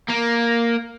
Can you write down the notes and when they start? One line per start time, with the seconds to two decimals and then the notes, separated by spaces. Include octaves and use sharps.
0.10 A#3